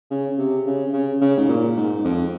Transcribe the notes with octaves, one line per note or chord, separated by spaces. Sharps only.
C#3
C3
C#3
C#3
C#3
G#2
A#2
G#2
F2